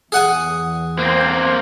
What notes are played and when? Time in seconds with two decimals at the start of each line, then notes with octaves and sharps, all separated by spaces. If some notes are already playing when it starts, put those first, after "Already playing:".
0.12 E2 G#4 F#5 G#5
0.99 A#3 C4 C5